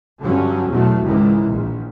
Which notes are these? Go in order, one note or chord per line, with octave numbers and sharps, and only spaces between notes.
G2 D3 F#3 C#4
E2 B2 F#3 A3
C#2 G#2 D#3 E3
A#1 A#2